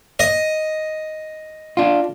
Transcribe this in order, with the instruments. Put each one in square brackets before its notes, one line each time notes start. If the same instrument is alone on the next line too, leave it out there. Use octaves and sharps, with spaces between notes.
[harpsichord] D#5
[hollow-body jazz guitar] D4 F4